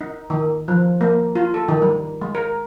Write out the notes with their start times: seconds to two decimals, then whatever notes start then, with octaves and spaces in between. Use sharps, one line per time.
0.01 D#4
0.30 D#3
0.68 F3
1.01 A#3
1.35 F4
1.54 A4
1.68 D#3
1.82 G3
2.21 G#3
2.35 A#4